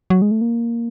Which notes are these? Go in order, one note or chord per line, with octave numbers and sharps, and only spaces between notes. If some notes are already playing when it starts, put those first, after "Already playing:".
F#3
G#3
A3
A#3